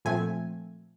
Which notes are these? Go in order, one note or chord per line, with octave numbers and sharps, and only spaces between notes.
A#2 F3 A3 C4 G#5